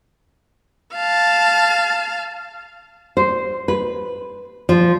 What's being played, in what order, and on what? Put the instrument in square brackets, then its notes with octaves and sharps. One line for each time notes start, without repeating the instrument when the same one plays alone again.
[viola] F5 A5
[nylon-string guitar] C5
B4
F3